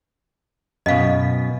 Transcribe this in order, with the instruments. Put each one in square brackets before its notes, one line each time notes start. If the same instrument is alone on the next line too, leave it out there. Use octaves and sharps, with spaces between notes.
[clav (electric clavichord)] F#2 B2 [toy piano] D#5 F5